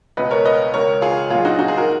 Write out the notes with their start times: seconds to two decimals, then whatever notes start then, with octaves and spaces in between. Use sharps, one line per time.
0.17 C#2 B2 B4 D#5
0.31 A#4 C#5
0.45 B4 D#5
0.74 C#2 C#3 A#4 C#5
1.02 F4 G#4
1.30 B1 A#2 F4 G#4
1.45 D#4 F#4
1.59 D#4 F#4
1.68 F4 G#4
1.77 F#4 A#4